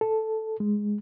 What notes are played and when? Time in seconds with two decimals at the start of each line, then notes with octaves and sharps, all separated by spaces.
0.01 A4
0.60 G#3